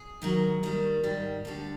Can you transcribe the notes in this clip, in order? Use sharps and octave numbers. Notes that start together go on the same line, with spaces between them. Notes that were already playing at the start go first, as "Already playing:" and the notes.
Already playing: G#4
G#2 D#3 F#3
D#2 D#3 G3
G#2 D#3 G3
D2 D3 G3 A4